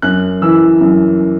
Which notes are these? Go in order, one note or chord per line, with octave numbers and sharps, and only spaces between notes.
F#2 F#6
E3 E6
F#2